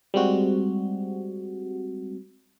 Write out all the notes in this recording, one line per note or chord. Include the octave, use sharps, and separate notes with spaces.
G3 G#3 C4 F#4